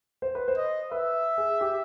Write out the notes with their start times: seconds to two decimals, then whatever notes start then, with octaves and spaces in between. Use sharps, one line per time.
0.22 C5
0.35 B4
0.48 C5
0.57 D#5
0.91 B4 E5
1.38 G#4
1.61 G4